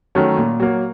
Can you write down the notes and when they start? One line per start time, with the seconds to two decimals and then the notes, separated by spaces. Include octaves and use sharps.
0.15 D#3 F#3 A3 C#4
0.37 A#2
0.60 F#3 A#3